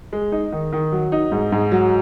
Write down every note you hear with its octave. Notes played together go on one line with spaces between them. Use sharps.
G#3
D#4
D#3
D#3
F#3
D#4
G#2
G#2
F#3